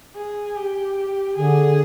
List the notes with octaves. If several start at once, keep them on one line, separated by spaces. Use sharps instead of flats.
G#4
G4
D3 G#4